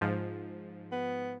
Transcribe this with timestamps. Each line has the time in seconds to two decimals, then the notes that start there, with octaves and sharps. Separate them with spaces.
0.01 G#2 F3
0.92 B3